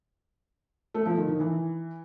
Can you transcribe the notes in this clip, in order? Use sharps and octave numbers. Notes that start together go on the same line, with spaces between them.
A3
F3
D#3
D#3
E3